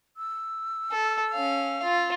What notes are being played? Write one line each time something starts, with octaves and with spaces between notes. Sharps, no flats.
E6
A4
C#4 F5
F4